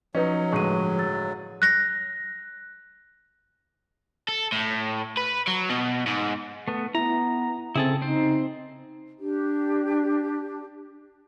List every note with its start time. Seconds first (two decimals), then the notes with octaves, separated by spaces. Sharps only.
0.15 F3 F#3 C#4 D#4 B4 D#5
0.52 G1 A2 G#3 C#6 D#7
0.98 E6 A6
1.62 F#6 A#6
4.28 A4
4.52 A2
5.17 B4
5.48 F#3
5.70 B2
6.07 G#2
6.68 A3 B3
6.95 B3 E4 A#5
7.76 C#3 C4 E4 G#4 A4
8.02 C4 D#4 C5
9.19 D4 G4